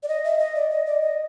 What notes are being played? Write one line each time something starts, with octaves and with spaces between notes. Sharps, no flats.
D5
D#5
E5
D#5
D5
D#5
D5
D#5